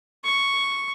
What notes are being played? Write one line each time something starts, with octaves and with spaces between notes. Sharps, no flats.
C#6